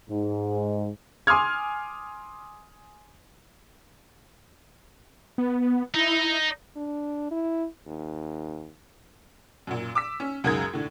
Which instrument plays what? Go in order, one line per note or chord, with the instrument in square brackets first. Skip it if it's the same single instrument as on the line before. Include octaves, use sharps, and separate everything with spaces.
[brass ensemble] G#2
[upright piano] G#5 C6 D6 D#6 F6 G#6
[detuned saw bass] B3
[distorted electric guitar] D#4 [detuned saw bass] E4
[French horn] D4
E4
D#2
[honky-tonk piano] F#2 A#2
D6 E6 B6
C#4
C#2 F#2 G#4 A#4 D#6 G#6
A2 D3